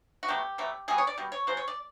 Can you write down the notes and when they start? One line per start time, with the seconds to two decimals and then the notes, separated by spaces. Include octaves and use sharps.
0.23 F#4
0.28 B2 F#3 A3 G4
0.58 B2 F#3 A3
0.88 B2 G3 B3 G#4
0.98 C#5
1.07 D5
1.18 B2 G3
1.32 C#5
1.47 C#3 F#3 C5
1.57 C#5
1.68 D5